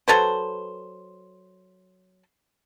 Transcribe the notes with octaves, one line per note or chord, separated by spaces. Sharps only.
F#3 A4 B4 C5